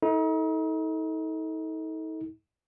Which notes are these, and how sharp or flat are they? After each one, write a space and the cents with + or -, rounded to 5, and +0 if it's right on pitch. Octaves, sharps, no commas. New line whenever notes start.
D#4 +40 A4 +0